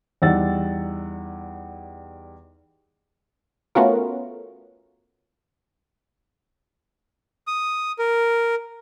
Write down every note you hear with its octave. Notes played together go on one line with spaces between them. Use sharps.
E2 G3 D#4 F#5 E6 A6
A3 B3 C#4 F4 F#4 A#4
D#6
A#4